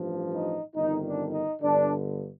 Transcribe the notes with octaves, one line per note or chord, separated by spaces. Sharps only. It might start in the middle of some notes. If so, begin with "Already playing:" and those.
Already playing: A1 G2 F3
D#4
G1 F2 D#3 D#4
D4
D#4
G1 G2 D3 D4